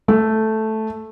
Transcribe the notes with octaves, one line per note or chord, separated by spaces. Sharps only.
A3